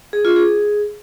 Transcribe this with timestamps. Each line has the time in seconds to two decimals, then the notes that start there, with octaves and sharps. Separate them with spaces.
0.13 G#4
0.25 F4
0.36 G#4